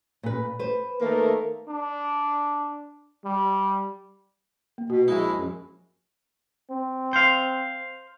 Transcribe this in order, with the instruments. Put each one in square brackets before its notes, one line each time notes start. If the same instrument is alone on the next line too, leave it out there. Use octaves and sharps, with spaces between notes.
[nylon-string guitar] A#2 B4
B4 C5
[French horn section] D#3 A3 A#4 [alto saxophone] A#3
[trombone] D4
G3
[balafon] A#3
[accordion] B2 [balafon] F#4
[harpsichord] A#1 D#4 [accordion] G#3 E4
[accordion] F#2
[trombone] C4
[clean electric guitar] C5 F5